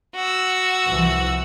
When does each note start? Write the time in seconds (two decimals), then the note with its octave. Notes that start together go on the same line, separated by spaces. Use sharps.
0.16 F#4 E6
0.87 C2 E3 F3